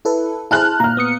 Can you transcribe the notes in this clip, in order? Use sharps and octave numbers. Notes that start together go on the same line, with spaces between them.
E4 A4 B4
E4 G#4 C5 A5 F6 F#6
A#2 A#5 F6
B3 D#6 C#7